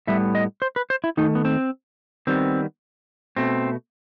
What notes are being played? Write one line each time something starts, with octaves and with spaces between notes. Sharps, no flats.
A2 G3 B3 E5
D#5
C5
B4
C5
E4
D#3 A3 D#4
B3
C4
D#3 G3 B3 C4
B2 A3 C4